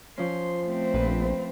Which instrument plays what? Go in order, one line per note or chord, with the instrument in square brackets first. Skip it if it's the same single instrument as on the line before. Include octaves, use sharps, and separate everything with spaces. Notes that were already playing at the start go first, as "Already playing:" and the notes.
[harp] F3 C#4 [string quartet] C6
[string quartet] A3 C4
[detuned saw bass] A#1 [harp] B4